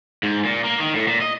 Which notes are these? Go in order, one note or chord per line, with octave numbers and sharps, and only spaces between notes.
G#2
A#2
A#3
D#3
A2
A#2
D#5